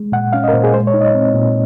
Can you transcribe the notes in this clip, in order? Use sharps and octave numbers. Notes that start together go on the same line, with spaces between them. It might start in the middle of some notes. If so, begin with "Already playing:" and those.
Already playing: G#3
A#2 F#5
C#4 F5
D#5
A#4
A#2 C5
G#4
G#3 C5
C#5
D#4
D#5
C4
A#2